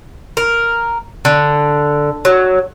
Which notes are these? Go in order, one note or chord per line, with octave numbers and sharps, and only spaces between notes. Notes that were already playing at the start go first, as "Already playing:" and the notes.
A#4
D3
F#3